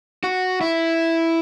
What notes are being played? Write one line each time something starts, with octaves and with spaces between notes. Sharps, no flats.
F#4
E4